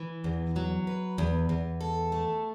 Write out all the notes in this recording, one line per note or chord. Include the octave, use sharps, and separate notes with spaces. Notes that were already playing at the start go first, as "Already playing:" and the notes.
Already playing: E3
E2
F#3
B4
E2
E2
A4
A3